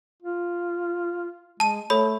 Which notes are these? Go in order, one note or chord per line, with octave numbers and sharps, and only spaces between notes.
F4
G#3 A5 D#7
A3 A4 C#5 B5